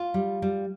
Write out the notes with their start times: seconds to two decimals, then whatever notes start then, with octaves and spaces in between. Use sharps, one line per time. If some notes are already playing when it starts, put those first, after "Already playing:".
Already playing: F4
0.14 G3
0.42 G3